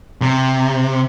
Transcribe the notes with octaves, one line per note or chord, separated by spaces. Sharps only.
C3